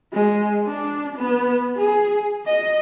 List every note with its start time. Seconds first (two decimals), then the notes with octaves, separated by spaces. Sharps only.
0.14 G#3
0.67 D4
1.16 B3
1.77 G#4
2.46 D#5